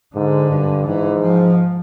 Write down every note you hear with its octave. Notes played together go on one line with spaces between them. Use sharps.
G#2 D3
G2
G#2 E3
F3